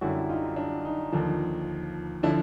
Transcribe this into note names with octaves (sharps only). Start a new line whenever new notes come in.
F#2 D3 G3 E4 F#4
D#4 F4
D4
D#4
D#2 D3 F3
D3 F3 D4 E4